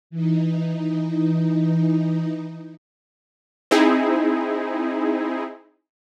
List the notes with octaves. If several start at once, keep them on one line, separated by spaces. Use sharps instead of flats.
E3 D#4
C4 D#4 E4 G#4